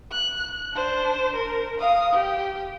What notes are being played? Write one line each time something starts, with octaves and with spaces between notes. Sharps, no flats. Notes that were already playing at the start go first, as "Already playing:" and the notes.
F#6
D4 C5
A#4
F5 D#6
G4